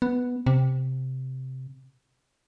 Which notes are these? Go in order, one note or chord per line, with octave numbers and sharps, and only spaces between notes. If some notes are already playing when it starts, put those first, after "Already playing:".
B3
C3